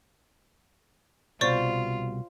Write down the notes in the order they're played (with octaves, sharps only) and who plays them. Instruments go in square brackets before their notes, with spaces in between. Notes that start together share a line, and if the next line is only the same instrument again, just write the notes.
[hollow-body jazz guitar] C2 B2 [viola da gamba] F4 [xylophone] C5 D5 C#6